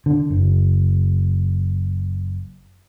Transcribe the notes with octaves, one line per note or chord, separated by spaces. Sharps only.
D3
F#1